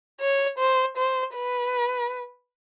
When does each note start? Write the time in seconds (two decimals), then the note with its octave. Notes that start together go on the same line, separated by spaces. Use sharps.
0.20 C#5
0.58 C5
0.97 C5
1.35 B4